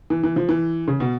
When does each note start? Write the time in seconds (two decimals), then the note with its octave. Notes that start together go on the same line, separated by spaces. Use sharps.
0.10 E3
0.23 E3
0.36 F3
0.49 E3
0.88 C#3
1.00 B2